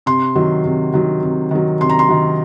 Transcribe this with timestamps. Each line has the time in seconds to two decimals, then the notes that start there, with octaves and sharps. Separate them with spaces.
0.06 C3 C6
0.35 D#3 F#3
0.65 C3
0.93 D#3 F#3
1.23 C3
1.51 D#3 F#3
1.81 C3 C6
1.89 A#5
1.99 C6
2.09 D#3 F#3